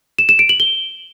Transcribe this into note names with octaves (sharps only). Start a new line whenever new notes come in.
E7
E7
D7
F#7
G7